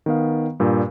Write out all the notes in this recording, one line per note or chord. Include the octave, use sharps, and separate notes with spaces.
D#3 B3 F5
G2 A#2